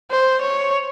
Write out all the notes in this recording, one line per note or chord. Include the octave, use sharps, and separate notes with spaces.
C5
C#5